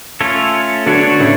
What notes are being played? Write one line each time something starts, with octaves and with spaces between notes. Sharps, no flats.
A3 C#4 F4 A4 C#5
D3 F#3 B3 D4 F#4 C#5
A2 C#3